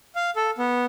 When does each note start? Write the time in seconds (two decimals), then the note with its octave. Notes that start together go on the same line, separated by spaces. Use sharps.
0.15 F5
0.36 A4
0.58 B3